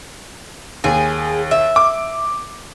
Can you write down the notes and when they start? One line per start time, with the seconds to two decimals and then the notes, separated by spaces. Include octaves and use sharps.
0.84 D#2 G#4
1.51 E5
1.76 D6